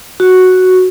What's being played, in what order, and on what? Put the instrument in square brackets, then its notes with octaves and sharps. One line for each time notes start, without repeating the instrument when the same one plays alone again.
[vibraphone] F#4